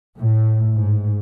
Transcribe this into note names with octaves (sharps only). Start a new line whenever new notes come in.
A2
G#2